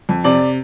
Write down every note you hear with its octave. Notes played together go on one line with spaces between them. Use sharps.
F2
C3 D5